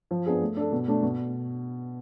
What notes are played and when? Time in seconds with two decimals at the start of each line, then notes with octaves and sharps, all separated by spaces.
0.11 F3
0.26 B3 D4 G#4
0.41 A3
0.57 D4 A4
0.72 B2
0.87 A3 D4
1.03 B2